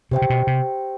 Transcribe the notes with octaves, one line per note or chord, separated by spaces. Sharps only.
C3 G4 C5 E5 G5
C3
B2
C3